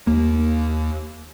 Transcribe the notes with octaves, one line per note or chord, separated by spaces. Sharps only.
D#2 A#3